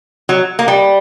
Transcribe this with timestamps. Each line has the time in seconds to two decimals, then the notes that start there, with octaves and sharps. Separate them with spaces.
0.29 F#3
0.59 A#3
0.68 G3